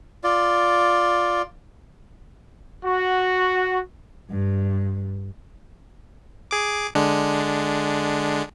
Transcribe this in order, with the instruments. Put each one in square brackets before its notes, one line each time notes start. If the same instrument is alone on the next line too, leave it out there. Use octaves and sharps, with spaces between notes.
[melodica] F4 D5
[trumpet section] F#4
[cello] G2
[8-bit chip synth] G#4 D6
D3 G#3 D4